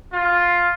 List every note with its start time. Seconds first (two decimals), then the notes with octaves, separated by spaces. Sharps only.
0.13 F4